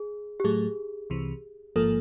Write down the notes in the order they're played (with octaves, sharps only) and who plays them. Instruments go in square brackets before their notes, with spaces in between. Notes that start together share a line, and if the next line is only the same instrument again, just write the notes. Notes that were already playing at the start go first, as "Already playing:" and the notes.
Already playing: [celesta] G#4
G4
[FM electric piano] A2 F#3 A3 [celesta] G#4
[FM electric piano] C2 C3 E3
[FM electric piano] A1 G#2 F3 A#3 [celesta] A4